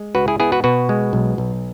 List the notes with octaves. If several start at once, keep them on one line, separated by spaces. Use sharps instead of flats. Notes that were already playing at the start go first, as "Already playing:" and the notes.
Already playing: G#3
C#2 F#4 B4
E4 G#4
B3 E4 G#4
F#4 B4
B2 F#4 B4
G#3
B1
B1